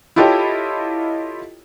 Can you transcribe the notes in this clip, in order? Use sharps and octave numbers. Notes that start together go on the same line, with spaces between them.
E4 F4 G4 A4 C#5 D#5